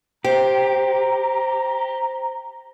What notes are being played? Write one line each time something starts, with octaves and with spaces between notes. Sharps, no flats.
G4 C5 A#5